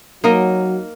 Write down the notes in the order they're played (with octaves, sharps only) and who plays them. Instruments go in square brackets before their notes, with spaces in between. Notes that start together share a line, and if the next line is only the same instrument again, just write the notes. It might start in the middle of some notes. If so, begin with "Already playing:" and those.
[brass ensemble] F#3 [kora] A#3 D#4 A#4 D#5